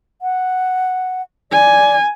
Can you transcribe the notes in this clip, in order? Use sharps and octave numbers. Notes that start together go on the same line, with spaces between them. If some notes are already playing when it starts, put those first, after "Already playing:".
F#5
D5 G#5